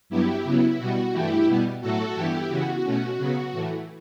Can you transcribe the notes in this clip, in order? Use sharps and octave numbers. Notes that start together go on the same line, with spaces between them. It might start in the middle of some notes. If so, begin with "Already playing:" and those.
G2 F#3 B3 E4 G4
C#3 F#3 B3 E4
B2 G3 B3 F#4
G2 E3 A3 E4 G4
B2 G3 B3
A2 F#3 A3 F#4 A4
G2 E3 G3 B3 E4 G4
C#3 E3 B3 F#4
B2 A3 C#4
C#3 F#3 B3
A2 E3 A3